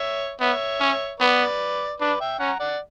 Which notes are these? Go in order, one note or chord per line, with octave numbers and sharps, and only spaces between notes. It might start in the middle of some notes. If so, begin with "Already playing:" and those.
Already playing: C#5 E5
B3 C#5 E5
C#4
B3 B4 D5
D4 B4 D5
E5 G5
C#4 F#5 A#5
D5 F#5